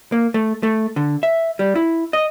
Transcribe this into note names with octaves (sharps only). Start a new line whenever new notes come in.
A#3
A3
A3
D3
E5
G3
E4
D#5